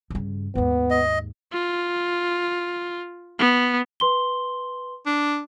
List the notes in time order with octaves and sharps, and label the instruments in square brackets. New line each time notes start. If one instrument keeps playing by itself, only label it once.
[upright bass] G2 C#3
[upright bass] D#2 G#2 [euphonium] B3
[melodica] D#5
[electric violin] F4
B3
[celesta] B4 C6 G7
[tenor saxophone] D4